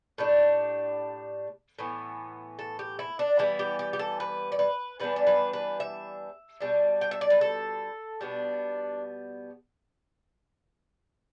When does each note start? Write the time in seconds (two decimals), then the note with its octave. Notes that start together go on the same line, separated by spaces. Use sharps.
0.18 A2 G3 D4
1.79 A2 E3 B3
2.59 A4
2.79 G4
2.99 E4
3.19 D4
3.39 E3 G3 B3 E4
3.59 G4
3.79 G4
3.93 G4
3.99 A4
4.20 B4
4.52 D5
4.59 B4
5.00 E3 G3 B3 D4 B4
5.16 D5
5.27 B4
5.53 B4
5.80 E5
6.60 B2 G3 D4
7.01 G5
7.11 E5
7.21 D5
7.30 B4
7.41 A4
8.21 B2 G3 B3 D4